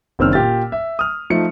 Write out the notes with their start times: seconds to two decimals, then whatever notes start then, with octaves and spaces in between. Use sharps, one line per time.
0.19 F#1 D#3 C4 D4 E6 F6
0.33 A#2 G4 A6
0.72 E5
0.99 D#6 F6
1.30 F3 A3 D#4 C#7